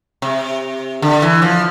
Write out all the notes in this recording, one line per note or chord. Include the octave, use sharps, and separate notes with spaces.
C3
D3
E3
F3